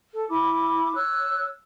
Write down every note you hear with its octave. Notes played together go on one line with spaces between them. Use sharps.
A4
E4 B5 D6
C#5 E6 F#6